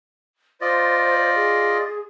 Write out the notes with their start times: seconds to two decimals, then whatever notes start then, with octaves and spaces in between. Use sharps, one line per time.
0.61 F4 C5 D5 D#5
1.35 G#4